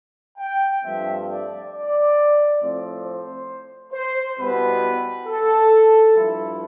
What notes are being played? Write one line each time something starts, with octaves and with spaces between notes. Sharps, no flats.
G5
G2 F3 A3 C4 E5
D5
D5
A2 F3 C4
C5
C5
B2 G3 B3 E4 B4
A4
G2 F3 A3 E4